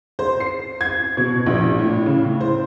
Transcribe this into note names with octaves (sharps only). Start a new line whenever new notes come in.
C5
C7
G#6
B2
A#1
A2
C#3
A2
C5